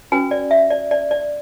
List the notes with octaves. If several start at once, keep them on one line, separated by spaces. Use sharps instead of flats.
C#4 F#4 B4 G#5
D5
E5
D5
D5
D5